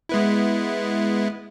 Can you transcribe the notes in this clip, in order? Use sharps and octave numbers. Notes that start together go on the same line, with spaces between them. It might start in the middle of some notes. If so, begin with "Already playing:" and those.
G#3 B3 E4